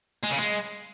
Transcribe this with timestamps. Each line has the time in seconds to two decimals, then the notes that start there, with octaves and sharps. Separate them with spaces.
0.23 G#3
0.30 C#3
0.38 G#3